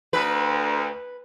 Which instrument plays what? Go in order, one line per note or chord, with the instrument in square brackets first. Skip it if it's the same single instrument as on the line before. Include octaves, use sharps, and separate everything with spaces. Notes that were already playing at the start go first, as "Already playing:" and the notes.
[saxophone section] D2 [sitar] B4